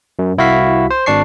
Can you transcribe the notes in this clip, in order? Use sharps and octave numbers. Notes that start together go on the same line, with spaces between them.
F#2
C2 E4 F#4 F5 B6
C5
G#1 D4 A5 C#6 C7